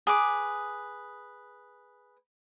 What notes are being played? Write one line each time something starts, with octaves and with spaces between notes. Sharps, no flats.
G#4 B4 D6